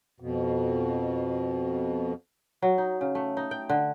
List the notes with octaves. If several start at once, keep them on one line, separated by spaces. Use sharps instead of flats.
F2 B2
F#3
D#4
C#3
A3
D#4
G5
D3